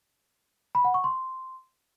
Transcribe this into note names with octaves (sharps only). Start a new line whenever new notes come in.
B5
F#5
C#6
C6